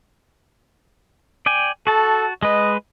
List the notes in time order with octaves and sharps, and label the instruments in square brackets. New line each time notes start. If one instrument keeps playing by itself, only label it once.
[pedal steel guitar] D5 G5 G#5
[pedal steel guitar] F#4 A5 [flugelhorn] A4
[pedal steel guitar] G#3 B4 [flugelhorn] D#5